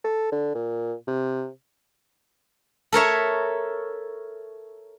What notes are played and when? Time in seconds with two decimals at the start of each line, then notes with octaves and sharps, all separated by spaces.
0.04 A4
0.32 D3
0.55 A#2
1.07 C3
2.92 A4 A#4 C#5 E5